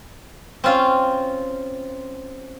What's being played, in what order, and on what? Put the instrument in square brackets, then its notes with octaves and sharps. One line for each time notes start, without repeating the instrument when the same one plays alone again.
[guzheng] C4 C#4 F4 F5